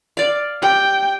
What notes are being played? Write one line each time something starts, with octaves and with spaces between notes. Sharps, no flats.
D5 F5
G4 G5